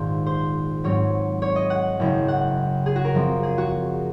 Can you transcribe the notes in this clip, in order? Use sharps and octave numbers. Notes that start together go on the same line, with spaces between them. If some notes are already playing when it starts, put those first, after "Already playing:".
Already playing: A#1 G#2 D#3 C5
C5
G#2 F#3 C4 C#5
C#5
D#5
F#5
F#1 F#2 C#3
F#5
G#4
F#4
A#4
F#2 F3 C4
G#4
F#4